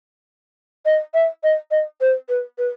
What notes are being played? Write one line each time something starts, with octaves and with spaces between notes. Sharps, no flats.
D#5
E5
D#5
D#5
C5
B4
B4